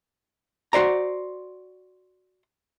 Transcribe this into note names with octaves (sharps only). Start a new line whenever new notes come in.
F#4 C5 D5 A#5